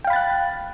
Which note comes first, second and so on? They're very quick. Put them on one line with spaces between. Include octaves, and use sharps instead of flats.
G5 F5 B5 A6 F#6